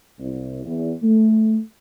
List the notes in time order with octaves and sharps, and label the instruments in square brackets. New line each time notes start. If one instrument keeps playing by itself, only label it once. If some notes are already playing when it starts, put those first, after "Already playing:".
[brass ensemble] C2
E2
A3